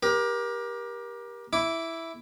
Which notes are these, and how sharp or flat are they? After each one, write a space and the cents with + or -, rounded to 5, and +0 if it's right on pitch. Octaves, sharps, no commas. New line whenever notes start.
G4 +10 A#4 +30
E4 +0 D6 -15